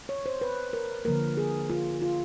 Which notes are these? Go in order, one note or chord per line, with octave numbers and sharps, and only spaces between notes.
C#5
C5
B4
A#4
D3 F3 A#3 A#4
G#4
F4
F4